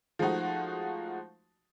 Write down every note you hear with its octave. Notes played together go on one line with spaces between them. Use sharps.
F3 G#3 A3 D#4 F#4